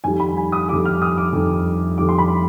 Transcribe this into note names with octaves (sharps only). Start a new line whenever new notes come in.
F2 D#3 G3 G#5
B5
G#5
D#6
F2 D#3 G3 D6
F6
D#6
D6
F2 D#3 G3
F2 D#3 G3 D6
C6
B5
C6